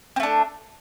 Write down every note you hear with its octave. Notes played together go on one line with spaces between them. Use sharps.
A3 C4 D4